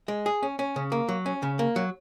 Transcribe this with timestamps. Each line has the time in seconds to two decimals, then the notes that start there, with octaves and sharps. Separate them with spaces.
0.08 G#3
0.26 G#4
0.43 C#4
0.59 C#4
0.76 C#3
0.92 A#3
1.09 F#3
1.26 C#4
1.43 C#3
1.59 A#3
1.76 F#3